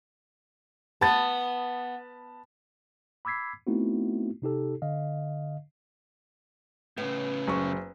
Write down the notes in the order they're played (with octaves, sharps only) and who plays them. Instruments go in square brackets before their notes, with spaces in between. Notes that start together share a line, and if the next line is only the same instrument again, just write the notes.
[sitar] B3 [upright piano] A5 B5 A6
[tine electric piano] B5 D6 E6 G#6 B6 C7
A3 B3 C4 D#4 E4 F#4
C3 D#4 G4 A4
D3 D#5 F5
[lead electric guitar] A2 C#3 [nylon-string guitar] B3
[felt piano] F#1 C#6